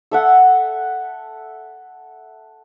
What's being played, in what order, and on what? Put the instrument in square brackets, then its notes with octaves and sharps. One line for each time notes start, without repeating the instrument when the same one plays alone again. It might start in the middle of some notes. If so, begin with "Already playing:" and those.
[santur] A4 E5 F#5